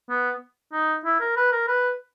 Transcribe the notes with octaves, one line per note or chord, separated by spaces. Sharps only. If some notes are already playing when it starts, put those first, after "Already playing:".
B3
D#4
E4
A#4
B4
A#4
B4